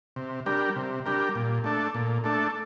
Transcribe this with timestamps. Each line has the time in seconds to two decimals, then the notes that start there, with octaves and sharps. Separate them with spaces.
0.16 C3
0.46 G3 D4 G4 A#4
0.76 C3
1.05 G3 D4 G4 A#4
1.35 A#2
1.64 A3 D4 A4
1.95 A#2
2.24 A3 D4 A4